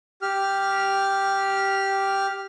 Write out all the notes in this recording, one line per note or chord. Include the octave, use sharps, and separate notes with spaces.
G4 F6